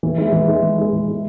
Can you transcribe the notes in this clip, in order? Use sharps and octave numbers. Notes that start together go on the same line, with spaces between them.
E3
G#3 E4
E3
G#3 E4
E3
G#3 E4
E3
G#3 E4